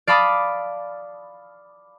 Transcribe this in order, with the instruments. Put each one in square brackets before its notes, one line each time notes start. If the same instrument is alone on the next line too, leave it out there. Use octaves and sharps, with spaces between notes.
[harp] D5 F5 A5 B5 D6 D#6